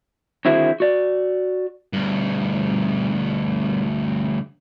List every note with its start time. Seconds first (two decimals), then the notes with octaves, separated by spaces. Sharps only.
0.45 D3 D#3 C4 E4 F#4 G#4
0.80 F#4 D5
1.93 D2 G2